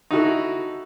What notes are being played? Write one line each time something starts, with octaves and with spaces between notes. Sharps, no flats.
D#4 E4 F#4 A4